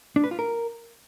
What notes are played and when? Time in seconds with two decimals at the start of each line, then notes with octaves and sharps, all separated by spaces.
0.16 D4
0.24 B4
0.31 F4
0.39 A#4